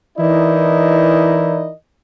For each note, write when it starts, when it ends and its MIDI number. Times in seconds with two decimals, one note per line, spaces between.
0.19 1.70 52
0.19 1.70 63
0.19 1.70 64
0.19 1.70 70
0.19 1.70 74
0.19 1.70 75